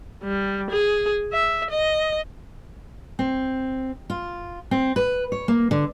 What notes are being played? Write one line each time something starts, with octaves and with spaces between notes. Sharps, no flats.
G3
G#4
E5
D#5
C4
F4
C4
B4
C#5
A#3
D3